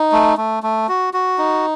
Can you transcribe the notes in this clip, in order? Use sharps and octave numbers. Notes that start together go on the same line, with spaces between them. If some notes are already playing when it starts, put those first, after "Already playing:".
Already playing: D#4
A3
A3
A3
F#4
F#4
D#4